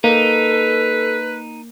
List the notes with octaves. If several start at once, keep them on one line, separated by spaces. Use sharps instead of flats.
A#3 D#4 A4 B4